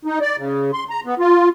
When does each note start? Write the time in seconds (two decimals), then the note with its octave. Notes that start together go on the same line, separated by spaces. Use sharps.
0.05 D#4
0.21 D5
0.38 C#3
0.73 C6
0.90 A#5
1.05 B3
1.19 F4